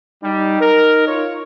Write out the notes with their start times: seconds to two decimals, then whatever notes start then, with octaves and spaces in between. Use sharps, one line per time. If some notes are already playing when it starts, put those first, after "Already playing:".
0.24 G3 D#4
0.61 A#4
1.07 F4 C#5